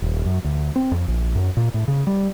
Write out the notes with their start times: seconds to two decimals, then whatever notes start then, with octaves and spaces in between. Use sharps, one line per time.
0.02 D#1
0.25 F#2
0.44 D2
0.76 C4
0.92 F2
1.08 A#1
1.35 F#2
1.57 A#2
1.74 A2
1.88 C#3
2.07 G3